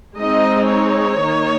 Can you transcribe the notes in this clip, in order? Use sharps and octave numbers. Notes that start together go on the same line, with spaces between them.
G#3 C4 D#4 D#5
C#5
D#3 A#3 D#4